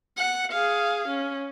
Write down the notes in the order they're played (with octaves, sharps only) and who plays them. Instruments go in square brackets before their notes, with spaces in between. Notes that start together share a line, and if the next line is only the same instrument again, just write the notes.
[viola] F#5
G#4 F5
C#4